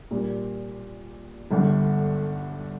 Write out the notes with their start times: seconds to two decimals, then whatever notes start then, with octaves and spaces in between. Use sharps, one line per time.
0.11 A#2 G3 A#3 D4
1.51 G1 G2 D3